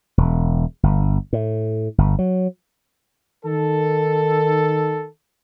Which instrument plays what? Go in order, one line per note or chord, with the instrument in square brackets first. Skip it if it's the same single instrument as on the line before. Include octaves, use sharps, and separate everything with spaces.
[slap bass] E1
G1
A2
G1
F#3
[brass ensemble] D#3 A4